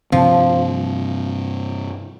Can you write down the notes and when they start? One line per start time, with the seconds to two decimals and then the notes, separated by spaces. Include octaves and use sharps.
0.12 G2 C3 F3 C4